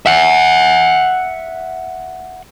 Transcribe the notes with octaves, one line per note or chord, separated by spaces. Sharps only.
E5 F#5